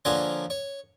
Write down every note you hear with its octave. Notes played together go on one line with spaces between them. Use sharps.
D3 F3 A#3 C5 C#5 G#5
C#5